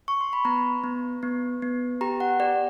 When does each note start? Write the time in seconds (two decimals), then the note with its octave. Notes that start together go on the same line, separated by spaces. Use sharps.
0.08 C#6
0.21 C6
0.33 B5
0.45 B3 A#5
0.84 B3
1.23 B3
1.62 B3
2.01 G4 A#5
2.20 F#5
2.40 G4 D5